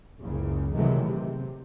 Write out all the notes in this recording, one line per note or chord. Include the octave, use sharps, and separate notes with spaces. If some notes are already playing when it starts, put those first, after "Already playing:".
F#1 C#2 F#2 C#3
C3 D#3 E3 F#3 G#3 A3
C3